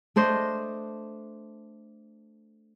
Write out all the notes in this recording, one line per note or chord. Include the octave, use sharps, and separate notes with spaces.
A3 D4 C5 D#5